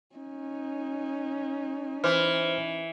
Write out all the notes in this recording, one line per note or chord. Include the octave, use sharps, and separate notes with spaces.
C#4 D#4
E3 C5 F6